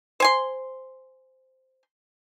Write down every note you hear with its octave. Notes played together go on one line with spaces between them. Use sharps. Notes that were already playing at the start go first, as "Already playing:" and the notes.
C5 G#5 C6